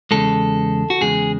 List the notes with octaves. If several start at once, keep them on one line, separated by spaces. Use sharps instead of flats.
E2 C#3 G#3 A4
F#4
E2 C#3 G#3 G#4